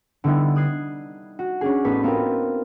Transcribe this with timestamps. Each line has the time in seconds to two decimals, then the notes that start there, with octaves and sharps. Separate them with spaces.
0.24 D3 G3 B3 D#4 E4
0.56 D#6 F#6 G#6 C7
1.39 F#4
1.61 C#4 D4 G#4
1.85 A1 B3 D#4 B4 B6
2.03 B3 C4 F4 G4 A#4 B4